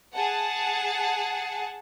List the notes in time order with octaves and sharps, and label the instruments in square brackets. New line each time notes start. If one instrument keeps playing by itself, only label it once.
[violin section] G#4 F#5 A5